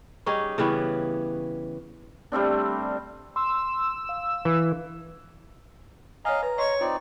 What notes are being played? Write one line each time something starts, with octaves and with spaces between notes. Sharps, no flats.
G3 C#4 D#4 G#4
C#3 E3 G3 B3
G3 A3 C4 D4
C6 E6
F5
E3
C#5 D#5 F5 G#5 A#5
B4 A#5
C#5 D#5 C6
C4 D#4 F4 D5